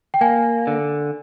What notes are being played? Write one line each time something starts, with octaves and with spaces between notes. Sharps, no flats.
G5
A#3 G#5
D3